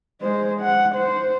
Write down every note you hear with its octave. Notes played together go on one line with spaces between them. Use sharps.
G#3 C5
F#5
C5